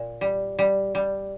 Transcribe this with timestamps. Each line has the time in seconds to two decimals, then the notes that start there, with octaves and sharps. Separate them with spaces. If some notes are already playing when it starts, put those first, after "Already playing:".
Already playing: A#2
0.21 G3
0.59 G3
0.95 G3